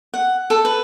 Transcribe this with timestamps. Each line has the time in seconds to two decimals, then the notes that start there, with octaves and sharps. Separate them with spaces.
0.14 F#5
0.50 A4
0.65 B4